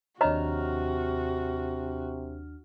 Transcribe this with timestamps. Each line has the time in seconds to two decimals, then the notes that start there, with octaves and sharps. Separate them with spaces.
0.21 D#2 C3 D4 F#4 C#5 D#5 A#5 F6